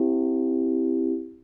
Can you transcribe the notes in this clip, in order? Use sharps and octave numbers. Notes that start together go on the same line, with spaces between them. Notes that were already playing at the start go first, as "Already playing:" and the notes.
Already playing: C4 E4 G4